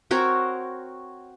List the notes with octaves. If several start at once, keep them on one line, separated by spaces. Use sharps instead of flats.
C4 F#4 A#4 C#5